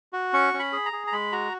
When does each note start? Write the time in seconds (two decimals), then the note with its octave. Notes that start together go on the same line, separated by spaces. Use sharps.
0.13 F#4
0.33 C#4 C#6
0.54 C#4
0.59 B5
0.72 G#4
0.86 A#5
0.93 G#4
1.07 A#5
1.12 G#3 B5
1.32 F#4 A#5